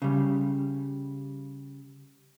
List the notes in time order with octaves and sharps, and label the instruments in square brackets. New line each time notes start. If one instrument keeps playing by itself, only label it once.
[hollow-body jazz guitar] C#3 G3